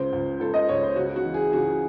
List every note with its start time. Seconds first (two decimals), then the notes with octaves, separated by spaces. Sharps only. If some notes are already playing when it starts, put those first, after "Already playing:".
Already playing: C#2 C#3 C5
0.13 C#2
0.40 C#2 A4
0.54 D#5
0.69 C#2 C#5
0.83 C5
0.96 C#3 F#4
1.16 F#4
1.24 E3
1.34 G#4
1.53 C#3 F#4